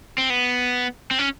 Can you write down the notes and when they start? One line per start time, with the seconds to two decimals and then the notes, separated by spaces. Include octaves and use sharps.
0.18 C4
0.30 B3
1.11 C4
1.19 C#4